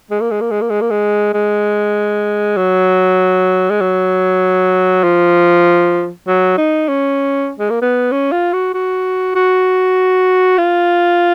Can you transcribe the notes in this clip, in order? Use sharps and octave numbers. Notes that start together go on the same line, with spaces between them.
G#3
A#3
G#3
A#3
G#3
A#3
G#3
A#3
G#3
G#3
F#3
G#3
F#3
F3
F#3
D#4
C#4
G#3
A#3
B3
C#4
F4
F#4
F#4
F#4
F4